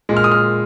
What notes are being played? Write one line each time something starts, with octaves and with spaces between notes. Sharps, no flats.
A#2 G#3
F6
D#6
F6